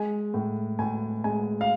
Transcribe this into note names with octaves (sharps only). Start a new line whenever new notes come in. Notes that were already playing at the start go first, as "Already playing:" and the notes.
Already playing: G#3 G#5
A2
A2 G#5
G#3 G#5
F5